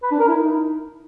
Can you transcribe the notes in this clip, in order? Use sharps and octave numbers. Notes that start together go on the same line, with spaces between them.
B4
D4
A#4
E4
D#4